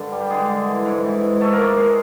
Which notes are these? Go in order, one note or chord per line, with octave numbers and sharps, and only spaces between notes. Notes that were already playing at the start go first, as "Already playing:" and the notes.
Already playing: G2 D3
G3
G4
D3 G#3 G#4
D3
E3
G#2
E3
G#2
G#2 A3 A4
A#3 A#4
G#2
G#3 G#4